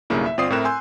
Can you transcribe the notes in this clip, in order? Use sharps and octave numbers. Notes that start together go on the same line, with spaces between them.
B1 G2 C#3 A#3 E4
E5
G1 C4 F4 D5 D#6 C7
A2 C4 E4 A#4 F#6 E7
G#5 C6 E6 G6